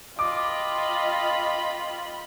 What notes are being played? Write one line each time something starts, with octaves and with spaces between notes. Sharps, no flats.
F4 D#5 G5 B5 D6